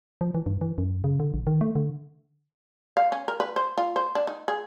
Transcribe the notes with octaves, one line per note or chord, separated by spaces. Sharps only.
F3
E3
G2
E3
F#2
C#3
D3
A#1
D#3
A3
D3
F5
C#4
A#4
B4
C5
F4
C5
D4
D#4
G#4